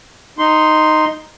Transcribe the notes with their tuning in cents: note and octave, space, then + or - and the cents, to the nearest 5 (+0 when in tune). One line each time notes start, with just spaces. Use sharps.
D#4 +0 C6 +0